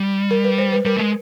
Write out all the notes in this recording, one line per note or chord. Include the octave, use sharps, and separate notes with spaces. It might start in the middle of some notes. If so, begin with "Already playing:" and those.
Already playing: G3
A#4
B4
C5
B4
G3 A#4
A3
G#3